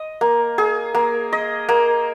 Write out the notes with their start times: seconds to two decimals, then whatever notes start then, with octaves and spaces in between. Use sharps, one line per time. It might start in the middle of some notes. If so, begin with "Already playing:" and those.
Already playing: D#5
0.21 A#3
0.58 G#4
0.95 A#3
1.33 D#5
1.69 A#3